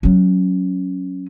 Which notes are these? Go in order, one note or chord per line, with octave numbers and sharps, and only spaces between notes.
F#3 C#4